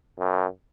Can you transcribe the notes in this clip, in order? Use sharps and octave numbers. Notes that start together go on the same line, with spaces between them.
F#2